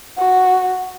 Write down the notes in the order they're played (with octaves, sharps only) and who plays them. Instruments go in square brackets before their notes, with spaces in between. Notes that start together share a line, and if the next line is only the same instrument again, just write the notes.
[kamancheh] F#4